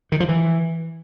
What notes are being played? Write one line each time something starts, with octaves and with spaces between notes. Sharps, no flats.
D#3
F3
E3